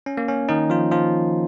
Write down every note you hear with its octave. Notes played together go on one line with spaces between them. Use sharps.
C#4
A#3
C#4
D#3 D#4
F3 F4
F3 F4